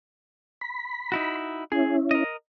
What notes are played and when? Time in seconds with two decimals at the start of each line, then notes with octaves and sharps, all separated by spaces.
0.61 B5
1.12 D#4 E4 F#4
1.72 C#4 E4 G#4
2.11 A#4 D#5